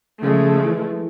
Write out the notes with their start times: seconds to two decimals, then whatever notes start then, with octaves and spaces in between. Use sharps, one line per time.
0.22 C#3 F3 G#3 A3
0.64 E3